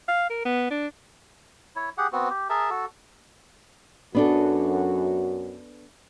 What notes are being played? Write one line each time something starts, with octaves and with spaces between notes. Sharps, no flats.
F5
A#4
B3
D4
E4 C#5
G4 G#4 F#5
B3 C4 F#4
G4
G#4 A#4 E5 A5
F#4 A4
F#2 B3 D4 F#4 A4